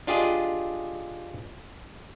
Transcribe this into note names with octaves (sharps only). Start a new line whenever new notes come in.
D4 F4 G4 G#4 D#5